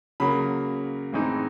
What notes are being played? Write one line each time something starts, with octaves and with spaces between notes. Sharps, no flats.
C#3 F#3 A#3 B5
A2 E3 G#3 C4 D#4